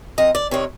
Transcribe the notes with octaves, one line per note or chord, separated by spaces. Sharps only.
F2 D#5
D5
C3 D#3 C#5